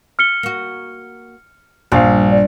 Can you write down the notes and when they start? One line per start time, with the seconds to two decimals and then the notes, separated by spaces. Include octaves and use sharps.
0.19 F6 C#7 G7
0.43 A#3 F#4
1.92 A#1 G2 F5
2.32 D5